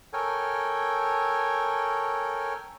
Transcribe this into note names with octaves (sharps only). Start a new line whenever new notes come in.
A4 A#4 C#5 G5 G#5